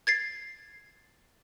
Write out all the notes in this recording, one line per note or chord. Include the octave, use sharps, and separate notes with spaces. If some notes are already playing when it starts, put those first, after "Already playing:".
G#6 A6 C7